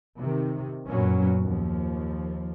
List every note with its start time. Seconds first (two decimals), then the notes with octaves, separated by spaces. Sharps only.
0.18 C3 D#3
0.88 F#2 A#2 F#3 B3 C#4
1.41 D#2 F3